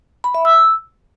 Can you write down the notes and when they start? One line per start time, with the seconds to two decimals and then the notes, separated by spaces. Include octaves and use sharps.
0.24 B5
0.35 E5
0.45 E6